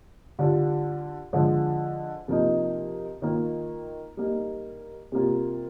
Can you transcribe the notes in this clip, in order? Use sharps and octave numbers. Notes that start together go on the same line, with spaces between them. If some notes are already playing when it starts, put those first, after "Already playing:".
D3 G3 D4 F4
D3 F3 G#3
C3 F3 A#3 D#4
D#3 A#3 F4
G3 A#3 D#4
C3 G3 A#3 F4